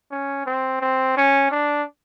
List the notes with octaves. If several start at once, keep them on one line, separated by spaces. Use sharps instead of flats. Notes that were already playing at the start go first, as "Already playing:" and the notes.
C#4
C4
C4
C#4
D4